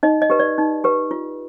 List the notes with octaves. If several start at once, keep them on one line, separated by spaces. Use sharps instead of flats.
D#4 D#5
D#5
G4 B4
D5
D#4
G4 B4
F4